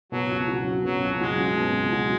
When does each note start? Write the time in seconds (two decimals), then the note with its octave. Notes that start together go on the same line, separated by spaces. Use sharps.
0.11 B2 F#3
0.31 C#2
0.48 F#3
0.67 C#4
0.84 B2 F#3
1.02 C#2
1.21 F#3 G#3
1.39 C#4
1.57 B2
1.75 C#2
1.92 F#3